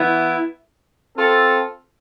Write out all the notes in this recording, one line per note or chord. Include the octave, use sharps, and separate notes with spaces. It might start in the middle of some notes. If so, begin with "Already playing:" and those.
Already playing: E3 B3 E4
C4 F4 A4